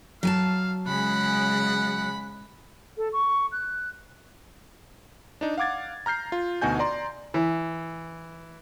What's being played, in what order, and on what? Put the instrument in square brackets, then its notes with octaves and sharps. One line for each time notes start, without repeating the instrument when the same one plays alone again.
[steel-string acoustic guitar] F#3 G#5 A5 [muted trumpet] F5
[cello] C#3 G#3 [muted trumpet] F#5 [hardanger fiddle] B5
[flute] A4
C#6
F#6
[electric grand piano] D4 D#4
F5 F#5 D6 G#6 A6
A#5 F6 G6 C7
F4
D2 B2 D#4 F#4 G#5 G6
D5 A#5 C6
[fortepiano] E3